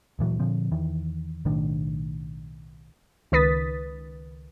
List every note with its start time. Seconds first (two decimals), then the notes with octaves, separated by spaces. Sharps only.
0.19 D1 A#2 E3 F#3
0.40 A#2 D3 F3 C4
0.72 E2 D#3 E3
1.45 B1 A2 D#3 D4
3.32 C#2 D#3 B4 D#6 A6 B6